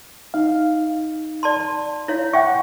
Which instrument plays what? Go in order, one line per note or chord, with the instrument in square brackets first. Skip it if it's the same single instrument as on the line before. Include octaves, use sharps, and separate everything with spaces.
[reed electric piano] D#4 F5
[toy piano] D5 A5 C6
E4 C#5 F5
[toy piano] E5 [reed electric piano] F#5 G5 C#6